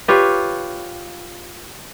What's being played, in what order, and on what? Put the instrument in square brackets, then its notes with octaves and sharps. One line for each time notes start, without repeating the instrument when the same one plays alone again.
[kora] F4 G4 B4 C#5